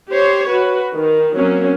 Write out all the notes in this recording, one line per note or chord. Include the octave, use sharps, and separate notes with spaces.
G4 C5 C#5
F#4 B4
D#3
F#3 A#3 C4 C#4